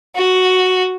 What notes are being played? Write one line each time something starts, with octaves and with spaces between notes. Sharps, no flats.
F#4